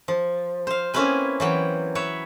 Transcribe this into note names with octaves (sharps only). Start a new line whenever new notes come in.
F3
C5 F5
A#3 C4 C#4 E4 B4 G#5
E3 F#3 G5
B4 C#5 E5